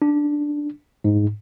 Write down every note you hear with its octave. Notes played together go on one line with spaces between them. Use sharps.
D4
G#2